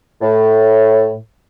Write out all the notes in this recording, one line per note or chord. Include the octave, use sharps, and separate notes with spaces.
A2